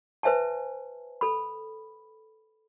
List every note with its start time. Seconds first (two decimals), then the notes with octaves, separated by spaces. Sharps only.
0.23 B4 C5 E5 G#5 A5
1.21 A4 B5